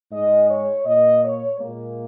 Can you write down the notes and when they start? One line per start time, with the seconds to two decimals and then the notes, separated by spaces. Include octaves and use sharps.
0.11 G#2 G#3 D#5
0.48 C#5
0.84 A#2 A#3 D#5
1.23 C#5
1.59 A#2 G#3 A#3